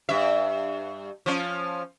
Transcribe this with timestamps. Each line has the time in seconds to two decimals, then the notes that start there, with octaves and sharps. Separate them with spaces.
0.09 G2 E5
1.26 F3 C#4